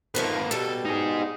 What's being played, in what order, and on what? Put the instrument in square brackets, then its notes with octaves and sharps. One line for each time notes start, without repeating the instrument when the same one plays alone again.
[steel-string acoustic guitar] D#3 F3 A3 [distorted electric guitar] A#3 B4
[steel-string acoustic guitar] B2 G3 [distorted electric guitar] A4
[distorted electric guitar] D#4 G#4